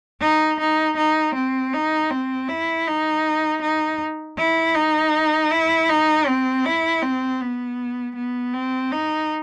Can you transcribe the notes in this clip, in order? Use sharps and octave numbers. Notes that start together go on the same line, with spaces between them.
D#4
D#4
D#4
C4
D#4
C4
E4
D#4
D#4
E4
D#4
E4
D#4
C4
E4
C4
B3
B3
C4
D#4